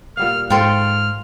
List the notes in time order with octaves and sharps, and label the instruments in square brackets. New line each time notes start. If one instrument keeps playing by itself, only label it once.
[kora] A#2 G3 F5 [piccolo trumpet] F6
[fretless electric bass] G#2 [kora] F4 A4 C5 [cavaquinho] G5 C6 C#6 [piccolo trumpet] F6